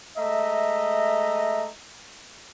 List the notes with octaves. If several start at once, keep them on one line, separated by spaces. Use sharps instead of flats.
G#3 A3 D#5 E5 A#5